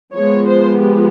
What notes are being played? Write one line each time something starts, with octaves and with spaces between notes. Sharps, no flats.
F3 G#3 B3 C#5
C5
G4